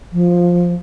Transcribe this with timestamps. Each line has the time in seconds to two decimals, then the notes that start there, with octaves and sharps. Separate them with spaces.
0.13 F3